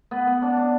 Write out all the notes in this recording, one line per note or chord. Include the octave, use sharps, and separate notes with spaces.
B3
B3
D4
D4